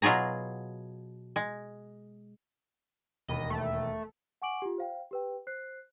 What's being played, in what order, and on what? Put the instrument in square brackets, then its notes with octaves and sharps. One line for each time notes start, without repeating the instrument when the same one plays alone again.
[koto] B2 F#3 F4 G#4 A#5
G#3
[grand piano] E1 D#2 B5 [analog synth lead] D#5
[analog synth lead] A3
[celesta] F#5 G#5 C#6 D6 D7 F#7
F4 G4
C5 F5 G5
G4 B4 G5
C5 F#6 C7